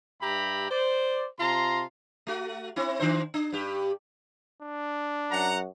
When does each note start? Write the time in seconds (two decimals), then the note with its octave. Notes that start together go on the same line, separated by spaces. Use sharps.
0.21 G2 G4 E5 G5 A#5 B5
0.70 C5 D5
1.39 C3 F4 A5 A#5 C6
2.27 A3 F#4
2.76 C4 E4
2.99 D#3 D4 C5
3.34 D4
3.52 G2 G4
4.62 D4
5.31 F#2 F#5 A#5